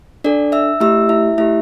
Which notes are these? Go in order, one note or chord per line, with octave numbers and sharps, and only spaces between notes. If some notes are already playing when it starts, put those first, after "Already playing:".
D4 A4 D5
E5 E6
A3 E4 G4 E5 E6
E4 E5
A3 E4 G4 E5